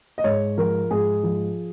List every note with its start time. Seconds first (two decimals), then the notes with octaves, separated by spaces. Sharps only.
0.18 D#5
0.24 G#2 C#5
0.57 F3 A#4
0.90 G#2 G#4
1.23 F3